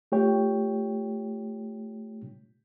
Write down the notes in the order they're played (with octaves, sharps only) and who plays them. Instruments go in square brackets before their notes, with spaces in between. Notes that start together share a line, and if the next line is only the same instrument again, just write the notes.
[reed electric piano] A3 F4 G4 C#5 G5